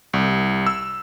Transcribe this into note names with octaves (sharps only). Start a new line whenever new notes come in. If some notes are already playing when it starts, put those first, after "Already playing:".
C2
E6